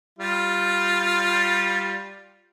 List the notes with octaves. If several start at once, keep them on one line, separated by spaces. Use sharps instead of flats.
G3 F4